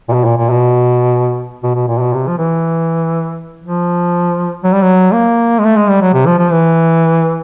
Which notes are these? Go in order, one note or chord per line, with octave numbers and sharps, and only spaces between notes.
A#2
B2
A#2
A#2
B2
B2
B2
A#2
B2
C3
F3
E3
F3
F#3
G3
F#3
A#3
G#3
A3
G#3
G3
F#3
C3
F3
F3
E3